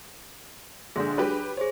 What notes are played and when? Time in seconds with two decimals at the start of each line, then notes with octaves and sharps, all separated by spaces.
0.96 A#1 G#2 D3 D4 G#4
1.18 F#3 G4 B4
1.57 G#4 C5 C#5